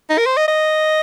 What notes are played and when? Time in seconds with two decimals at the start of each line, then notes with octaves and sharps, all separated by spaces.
0.10 D#4
0.18 A#4
0.26 C5
0.37 D#5
0.48 D#5